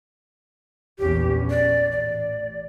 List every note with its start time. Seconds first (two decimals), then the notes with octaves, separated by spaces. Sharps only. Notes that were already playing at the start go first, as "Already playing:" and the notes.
0.99 A#1 E2 C#4 G4
1.50 D5
1.92 A1 D5